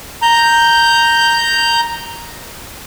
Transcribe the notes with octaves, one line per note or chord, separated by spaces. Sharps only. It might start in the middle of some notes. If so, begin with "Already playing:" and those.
A#5 G6